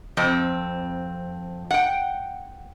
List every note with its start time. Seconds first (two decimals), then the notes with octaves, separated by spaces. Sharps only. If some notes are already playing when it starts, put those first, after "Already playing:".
0.17 F2 C4
1.71 F#5 G5